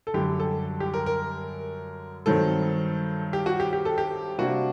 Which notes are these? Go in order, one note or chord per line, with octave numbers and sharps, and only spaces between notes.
A4
F#2 D3 G3 G4
A4
G4
A#4
A#4
G2 D#3 F#3 C4 A4
G4
F#4
G4
G4
A4
G4
C3 G3 A#3 D4 F#4